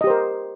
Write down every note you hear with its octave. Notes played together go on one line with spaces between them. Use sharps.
G4 A#4 C5 D#5